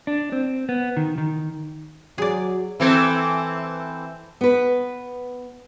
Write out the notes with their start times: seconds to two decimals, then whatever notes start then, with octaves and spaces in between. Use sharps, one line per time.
0.07 D4
0.32 C4
0.69 B3
0.97 D#3
1.18 D#3
2.18 F#3 G#4 D5
2.80 E3 C4 A4
4.41 B3 B4